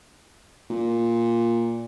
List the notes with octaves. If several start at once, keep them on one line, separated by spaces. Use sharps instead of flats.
A#2